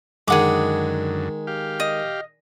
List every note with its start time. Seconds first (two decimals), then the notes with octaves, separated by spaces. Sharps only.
0.28 F#2 D3 D#3 G#3 G#4 F#5 D6
1.47 G4 F5
1.80 D#5